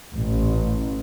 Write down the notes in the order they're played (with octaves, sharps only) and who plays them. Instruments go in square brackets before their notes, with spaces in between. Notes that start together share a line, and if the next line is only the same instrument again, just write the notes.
[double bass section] A1